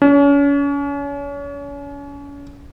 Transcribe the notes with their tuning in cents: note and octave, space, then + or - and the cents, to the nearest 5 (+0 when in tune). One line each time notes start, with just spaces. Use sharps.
C#4 +35